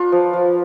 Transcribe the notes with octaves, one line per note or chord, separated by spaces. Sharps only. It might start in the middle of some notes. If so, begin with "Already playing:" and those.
Already playing: A#3 D4 F4 B4
F3
F3